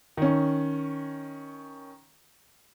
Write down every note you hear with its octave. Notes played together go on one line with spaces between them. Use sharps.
D#3 C#4